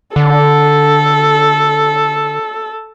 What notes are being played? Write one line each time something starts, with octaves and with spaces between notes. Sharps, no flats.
D3 A4